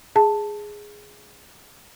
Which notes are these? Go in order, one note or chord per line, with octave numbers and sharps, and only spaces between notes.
G#4 A5